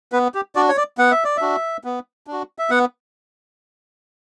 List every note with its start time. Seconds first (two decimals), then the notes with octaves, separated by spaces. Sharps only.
0.12 B3 B4
0.35 G4
0.55 D4 F#4 D5
0.69 C#5
0.77 D5
0.98 B3 F#5
1.11 E5
1.24 D5
1.37 D4 F#4 E5
1.84 B3
2.27 D4
2.32 F#4
2.59 E5
2.70 B3 F#5